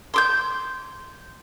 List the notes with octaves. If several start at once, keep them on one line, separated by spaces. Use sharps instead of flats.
C6 D6 G6